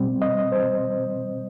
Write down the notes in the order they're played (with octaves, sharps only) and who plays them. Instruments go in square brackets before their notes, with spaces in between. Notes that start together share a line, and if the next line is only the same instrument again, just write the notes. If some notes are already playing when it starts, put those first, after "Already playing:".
Already playing: [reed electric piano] B2 G3 C4
D#5
C5